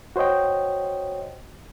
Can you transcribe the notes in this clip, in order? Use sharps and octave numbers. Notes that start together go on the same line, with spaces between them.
F#4 C5 C#5 D#5 G5